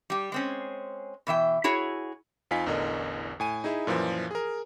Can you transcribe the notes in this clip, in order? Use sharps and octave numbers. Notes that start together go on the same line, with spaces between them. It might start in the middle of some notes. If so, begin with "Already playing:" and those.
G3 G4
G#3 C4 C#4
B2 E3 E5 G5
E4 F#4 G#4 C#5
F2 D#4 F4 F5 G#5 B6
A1 E2 D3 A#4 D#5
A2 G#5 D#7
D#4 E4 G#4 E5
F#2 A#2 E3 F3
G#4 A#4